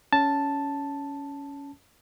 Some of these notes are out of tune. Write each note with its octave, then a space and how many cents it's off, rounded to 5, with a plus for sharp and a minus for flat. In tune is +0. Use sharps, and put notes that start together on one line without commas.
C#4 +15 A5 +0